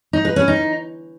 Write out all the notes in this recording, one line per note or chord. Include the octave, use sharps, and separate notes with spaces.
D#4
B4
C#4
D#4